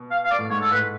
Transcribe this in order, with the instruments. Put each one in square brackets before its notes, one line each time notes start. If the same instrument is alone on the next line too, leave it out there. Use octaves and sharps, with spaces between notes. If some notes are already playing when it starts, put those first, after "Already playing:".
Already playing: [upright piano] B2
[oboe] F5
F5
D5
[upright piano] A2
[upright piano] G#2 [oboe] C#5
[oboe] A4
[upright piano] A2 [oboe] B4